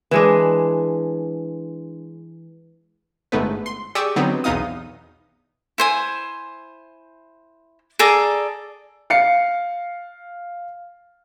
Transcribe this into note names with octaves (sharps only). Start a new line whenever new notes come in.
E3 G#3 D4
G1 G#2 A3 B3 B4
C6
G4 G#4 D5 C#6 D#6 E6
D3 F#3 B3 C4 D#4
B1 E2 B3 D#4 F5 D#6
E4 C5 G#5
G#4 A4 D5 A#5
F5 C7 C#7